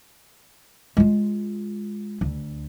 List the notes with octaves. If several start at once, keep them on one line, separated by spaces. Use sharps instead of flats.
G#3 F4
D2